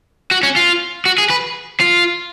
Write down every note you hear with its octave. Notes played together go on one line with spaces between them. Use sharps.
F#4
C#4
F4
F#4
G#4
B4
F4